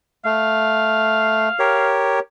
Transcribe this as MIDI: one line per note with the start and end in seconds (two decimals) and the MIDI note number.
0.25 1.49 57
0.25 1.94 77
1.59 2.19 67
1.59 2.19 70
1.59 2.19 73